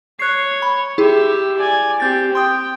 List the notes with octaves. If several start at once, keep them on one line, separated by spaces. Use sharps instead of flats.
C#5 F#6 C7
B5
E4 G4 G#4 E5
D5 G#5
C4 G4 G6 A6
G5 C6 D#6